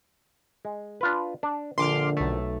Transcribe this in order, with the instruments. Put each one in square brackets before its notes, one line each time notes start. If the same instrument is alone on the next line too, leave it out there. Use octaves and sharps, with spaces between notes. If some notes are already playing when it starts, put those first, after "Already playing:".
[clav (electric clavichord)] G#3
D4 F4 B4
D4
[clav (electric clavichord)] A#1 [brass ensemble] D3 [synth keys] C6 D6 F6
[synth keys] B1 A3